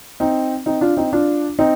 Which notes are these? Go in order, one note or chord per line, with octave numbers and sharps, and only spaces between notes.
C4 D#4
C4 D#4
D4 F4
C4 D#4
D4 F4
C4 D#4